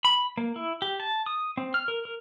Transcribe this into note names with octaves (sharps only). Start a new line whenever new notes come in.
B5
A#3
E4
G4
A5
D#6
C4
F6
A#4
A#4